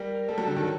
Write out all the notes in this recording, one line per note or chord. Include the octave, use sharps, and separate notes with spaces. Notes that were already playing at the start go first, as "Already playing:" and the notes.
Already playing: G3 A#4
G3 A4
F#3
D3
D#3